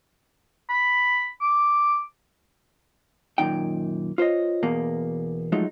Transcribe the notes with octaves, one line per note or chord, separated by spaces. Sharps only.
B5
D6
F#2 A#2 D#3 D#4 G5
F4 C5 C#5 D#5
E2 B2 A#3
F3 F#3 G#3 A3 D#4